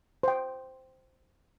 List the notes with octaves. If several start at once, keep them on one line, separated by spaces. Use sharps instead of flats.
C5 G5